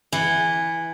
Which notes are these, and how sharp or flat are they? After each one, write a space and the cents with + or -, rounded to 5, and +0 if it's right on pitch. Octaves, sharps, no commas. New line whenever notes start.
E3 +0 F#5 +0